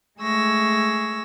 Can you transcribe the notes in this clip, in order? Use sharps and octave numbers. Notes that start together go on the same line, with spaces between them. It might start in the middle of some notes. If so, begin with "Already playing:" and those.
G#3 A3 G#4 C#6 E6 A#6